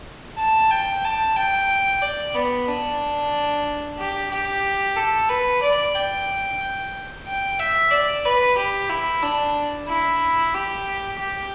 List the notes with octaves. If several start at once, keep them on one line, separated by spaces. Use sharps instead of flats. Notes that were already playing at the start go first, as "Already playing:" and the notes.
A5
G5
A5
G5
D5
B3
D4
G4
G4
A4
B4
D5
G5
G5
E5
D5
B4
G4
E4
D4
E4
G4
G4